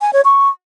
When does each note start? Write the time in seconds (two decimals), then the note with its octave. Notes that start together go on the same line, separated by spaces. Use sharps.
0.01 G#5
0.13 C#5
0.25 C#6